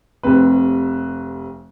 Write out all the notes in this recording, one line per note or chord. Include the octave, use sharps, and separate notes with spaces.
F1 C3 C4 B4